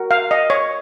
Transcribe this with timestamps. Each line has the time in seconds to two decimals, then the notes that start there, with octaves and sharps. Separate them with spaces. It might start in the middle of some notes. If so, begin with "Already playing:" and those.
Already playing: F#4 A#4
0.11 F5
0.31 D#5
0.50 C#5